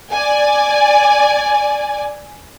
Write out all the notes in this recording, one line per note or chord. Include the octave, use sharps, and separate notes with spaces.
D5 G#5